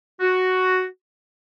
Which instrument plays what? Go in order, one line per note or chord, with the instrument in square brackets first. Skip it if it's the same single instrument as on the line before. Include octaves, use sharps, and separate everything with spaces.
[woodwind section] F#4